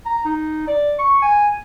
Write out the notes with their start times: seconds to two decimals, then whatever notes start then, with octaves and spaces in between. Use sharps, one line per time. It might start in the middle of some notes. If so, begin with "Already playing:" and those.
0.06 A#5
0.25 D#4
0.68 D5
0.99 C#6
1.22 G#5